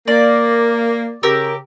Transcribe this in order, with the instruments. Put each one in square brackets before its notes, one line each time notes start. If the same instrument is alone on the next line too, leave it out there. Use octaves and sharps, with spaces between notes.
[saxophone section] A#3 [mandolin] D5
[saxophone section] C#3 G4 [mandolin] A#4 E6